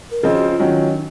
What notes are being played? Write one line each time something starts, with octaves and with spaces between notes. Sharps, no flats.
A#4
C#3 F3 C4 D#4 G#4
F#4
F4
D#3 F#3 C#4
D#4